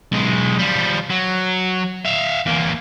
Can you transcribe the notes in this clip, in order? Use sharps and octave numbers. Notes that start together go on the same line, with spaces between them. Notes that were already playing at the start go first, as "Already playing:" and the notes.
B1 G#3
F3 G3
F#3
E5 F5
E2 A#3